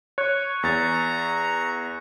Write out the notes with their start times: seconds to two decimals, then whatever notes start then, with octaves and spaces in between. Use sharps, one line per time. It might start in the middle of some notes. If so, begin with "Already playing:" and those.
0.18 C#5 C#6 F#6 C#7
0.63 E2 A#5 A6